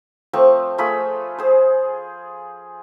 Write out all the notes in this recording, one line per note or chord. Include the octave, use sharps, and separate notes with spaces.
F3 A3 C4 C#6
A3 F4 G#4 B5
G#4 C5